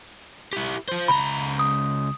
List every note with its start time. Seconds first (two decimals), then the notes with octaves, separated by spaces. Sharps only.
0.53 E4 G4
0.88 F4 C5
1.08 C#2 A#5 B5
1.59 D#6